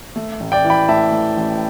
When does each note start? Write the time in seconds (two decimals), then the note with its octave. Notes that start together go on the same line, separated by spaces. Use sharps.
0.16 A3
0.40 A1
0.52 D5 G5
0.64 E3
0.70 G5 B5
0.89 A2 E5 A5
1.12 A3
1.37 A1